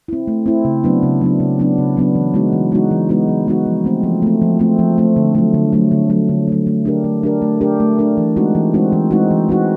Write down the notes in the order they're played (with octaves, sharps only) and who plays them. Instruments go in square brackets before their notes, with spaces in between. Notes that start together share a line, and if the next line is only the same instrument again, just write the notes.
[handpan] C4 E4
A3
C4 E4
C#3
F#3 B3 D4
C#3
F#3 B3 D4
C#3
F#3 B3 D4
C#3
F#3 B3 D4
E3
G#3 B3 D#4 F#4
E3
G#3 B3 D#4 F#4
E3
G#3 B3 D#4 F#4
E3
G#3 B3 D#4 F#4
F3
A3 C4
F3
A3 C4
F3
A3 C4
F3
A3 C4
D3
F#3 A3
D3
F#3 A3
D3
F#3 A3
D3
F#3 A3
A3
D4 G4 A#4
A3
D4 G4 A#4
A3
D4 G4 A#4
A3
D4 G4 A#4
E3
G#3 C4 D#4 F#4
E3
G#3 C4 D#4 F#4
E3
G#3 C4 D#4 F#4
E3
G#3 C4 D#4 F#4